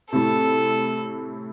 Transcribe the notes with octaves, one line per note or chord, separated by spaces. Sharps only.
A2 C3 A4